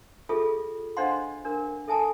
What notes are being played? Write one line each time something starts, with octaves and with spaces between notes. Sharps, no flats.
F4 G#4 A4 E5
D4 C5 D#5 F5 F#5 C6
D4 A#4
A4 E5 G#5 A5 D#6